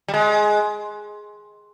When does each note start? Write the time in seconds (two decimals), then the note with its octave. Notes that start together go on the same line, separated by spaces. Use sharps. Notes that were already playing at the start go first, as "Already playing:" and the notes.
0.08 G3
0.14 G#3